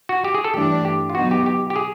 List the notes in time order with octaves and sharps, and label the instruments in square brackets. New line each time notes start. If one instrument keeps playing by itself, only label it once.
[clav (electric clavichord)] F#4
G4
G#4
A4
[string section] G2 E3 A3 D4 [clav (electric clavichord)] G4
[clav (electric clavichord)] G4
F4
[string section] B2 F#3 B3 D#4 [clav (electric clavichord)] F#4
[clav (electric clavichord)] G4
G4
G4
G#4